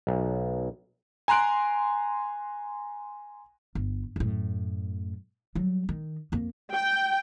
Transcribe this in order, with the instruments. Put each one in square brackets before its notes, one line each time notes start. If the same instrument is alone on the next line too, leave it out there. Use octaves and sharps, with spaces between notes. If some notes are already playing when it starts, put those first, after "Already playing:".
[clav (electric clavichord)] B1
[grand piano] G#5 A#5 C6 F#6 D7
[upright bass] G1
F#2 A2
F#3 G3
D#3
F2 A#3
[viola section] G5